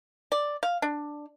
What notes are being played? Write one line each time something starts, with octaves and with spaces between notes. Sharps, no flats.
D5
F5
D4